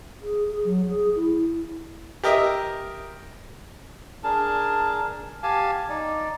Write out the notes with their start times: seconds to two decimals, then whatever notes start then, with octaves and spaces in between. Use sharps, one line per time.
0.22 G#4
0.51 G#4
0.65 F#3
0.89 G#4
1.16 E4
2.23 G4 A#4 D#5 E5
4.24 D4 G#4 A#4 A5
5.43 G4 F5 G#5 A5
5.89 D#4 D5